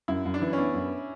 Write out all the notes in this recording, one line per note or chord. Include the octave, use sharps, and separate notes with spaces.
F#2 E4
F#2
D4
E3
C#4
B3 D4
F#2